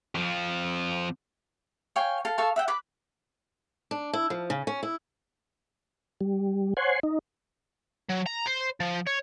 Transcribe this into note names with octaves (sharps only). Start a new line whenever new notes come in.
F2 F3
C#5 F5 G5 G#5
A4 F5
A4 F5 A5 C#6
E5 F#5 G5
B4 B5 D6
D4
E4
F3
C#3
C#4
E4
G3
C5 C#5 F#5 G#5 C6
D#4
F#3
A#5
C5
F3
C#5